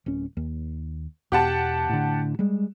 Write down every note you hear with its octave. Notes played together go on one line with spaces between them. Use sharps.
D1 C#4
D#2
E2 B2 G4 F#5 A5
A2 D3
G3 G#3